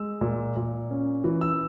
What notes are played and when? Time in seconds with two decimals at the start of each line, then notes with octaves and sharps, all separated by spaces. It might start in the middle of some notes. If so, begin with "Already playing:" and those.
Already playing: G#3 E6
0.21 A#2
0.56 A#2
0.90 C#4
1.24 E3
1.41 E6